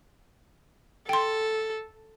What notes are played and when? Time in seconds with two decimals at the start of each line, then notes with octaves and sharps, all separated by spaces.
1.09 A4 G5 C6